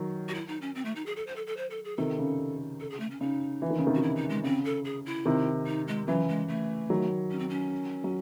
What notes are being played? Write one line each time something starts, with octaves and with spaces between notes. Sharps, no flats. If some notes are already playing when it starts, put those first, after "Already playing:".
Already playing: D#3 F#3
F#4
E4
D#4
C#4
C4
A3
D#4
G#4
A4
C5
A4
A4
C5
A4
G#4
C3 D#3 A4
C#3
A4
G#4
A3
C#4
C#3 D#4
E3
D#3
C#3
C3 D#3
F#4
E4
D#4
G#3
C#3 C4
A4
G#4
E4
C3 D#3
D#4
G#3
C#3 E3 F#3
G#3
A3
D#3 F#3
C#4
C4
C#4
F#3